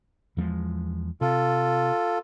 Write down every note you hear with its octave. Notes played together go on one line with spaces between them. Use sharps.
E2 F3 G#3
C3 F4 A4